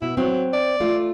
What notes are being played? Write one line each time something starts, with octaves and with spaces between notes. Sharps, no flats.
B2 E4
F#3 C4
D5
A3 F4